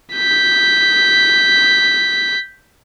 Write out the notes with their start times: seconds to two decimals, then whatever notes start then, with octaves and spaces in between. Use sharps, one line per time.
0.15 G6 B6